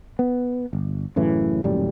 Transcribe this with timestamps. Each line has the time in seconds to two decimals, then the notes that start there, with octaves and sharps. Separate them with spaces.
0.19 B3
0.73 G1
1.16 F#2 A2 C#3 E3
1.64 D#1 F#2 A2 G3